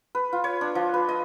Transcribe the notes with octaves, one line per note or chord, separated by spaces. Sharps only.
B4
F4
C#5
D4
F3
B4
D#5